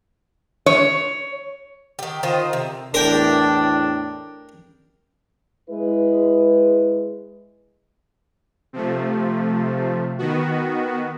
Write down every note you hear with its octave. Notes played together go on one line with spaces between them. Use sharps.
C#5
D#3 G4
D#3 F4 C5 D#5
C3
E2 A2 D4 A#4 G5
G#3 E4 B4
C3 F3 A3
D#3 B3 F#4